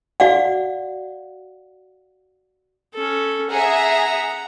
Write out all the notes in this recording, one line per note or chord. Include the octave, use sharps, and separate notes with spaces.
F#4 D5 F5 F#5
C#4 A4
G#4 E5 F#5 A#5